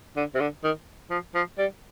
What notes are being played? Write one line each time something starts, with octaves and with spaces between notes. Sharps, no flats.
D3
C3
D3
D#3
F3
F3
G3